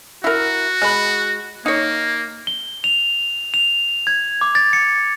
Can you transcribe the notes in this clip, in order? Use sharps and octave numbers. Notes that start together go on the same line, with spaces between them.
E4 F#4 A#4
G#3 D#5 B5
A#3 D#4 C#5
G7
F7
F7
G#6
D6
A6
C#7